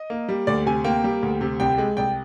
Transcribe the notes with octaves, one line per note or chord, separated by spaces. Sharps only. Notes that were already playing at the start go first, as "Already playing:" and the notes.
Already playing: D#5
A#3
G3
D2 D5
C3 G#5
A#3 G5
G3
D2
C3
C2 G5
G#3
C2 G5